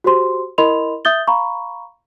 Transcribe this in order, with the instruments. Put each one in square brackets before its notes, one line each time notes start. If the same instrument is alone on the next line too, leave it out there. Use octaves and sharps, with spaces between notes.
[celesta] F#4 G4 C5 C6
E4 A#4 D#5 B5 C6 F7
E5 D#6 G6 A6 G7
F5 A#5 B5 C#6